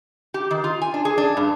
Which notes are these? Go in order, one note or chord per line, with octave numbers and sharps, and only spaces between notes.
G4
D#3
F4
G#5
D4
G#4
D4
G2